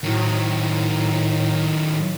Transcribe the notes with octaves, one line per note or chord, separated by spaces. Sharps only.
A2 D#3 F#3